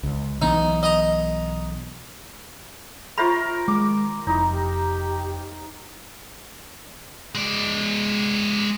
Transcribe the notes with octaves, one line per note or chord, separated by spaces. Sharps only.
C#2
B1 E3 B3 D#4
D#5 A#5
F4 A#4 C5 E5 B5 C#6
D#3 G#3 D6
F1 D#4 E4
G4
G#3 D5